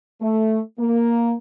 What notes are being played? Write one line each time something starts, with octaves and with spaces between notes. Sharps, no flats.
A3
A#3